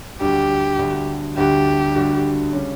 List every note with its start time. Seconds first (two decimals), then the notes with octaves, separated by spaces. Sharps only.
0.21 D2 D3 G3 D4 F#4 G4
0.79 D2 D3 G3 D4 F#4
1.37 D2 D3 G3 D4 F#4 G4
1.95 D2 D3 G3 D4 F#4
2.53 C#3 G3 C#4